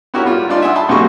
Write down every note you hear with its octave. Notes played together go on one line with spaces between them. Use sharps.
B3 E4 F#4 G4 A#4 C#5
G3 F4
D4 D#4 F4 D5 F5 C6
E5 F#5 G#5 D#6 E6
A5 B5 C6
B1 G3 G#3 A#3 F#4 C#6